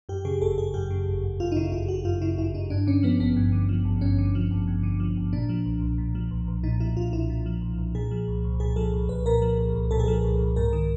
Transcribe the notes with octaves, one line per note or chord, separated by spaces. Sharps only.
F#2 G4
C#3 G#4
G1 A4
G1 G#4
F#2 G4
C#3
G1
G1
F#2 F4
D#4
C#3 E4
G1 F4
G1 F#4
F#2 F4
C#3 E4
G1 E4
G1 D#4
G2 D4
D3 C#4
F3 B3
G#1 B3
G2
D3
F3
G#1
G2 C#4
D3
F3
G#1
G2
D3
F3
G#1
A#2 D4
F3
B1
B1
A#2
F3
B1
B1
A#2 D#4
F3 E4
B1 F4
B1 E4
A#2
F3
B1
B1
A#2 G#4
F3
C2
C2
A#2 G#4
F3 A4
C2
C2 B4
A#2 A#4
F3
C2
C2
A#2 A4
G#4
F3 A4
C2
C2
G#2 A#4
D#3